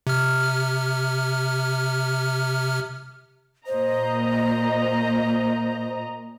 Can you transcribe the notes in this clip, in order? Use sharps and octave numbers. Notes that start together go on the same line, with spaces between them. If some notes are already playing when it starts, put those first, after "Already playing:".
C3 F6
A#2 C5 D#5 A#5